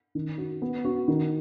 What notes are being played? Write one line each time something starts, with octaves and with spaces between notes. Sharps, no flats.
D#3
F#4
B3
F#4
D#3